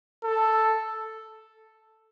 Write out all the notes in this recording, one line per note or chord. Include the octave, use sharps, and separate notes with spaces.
A4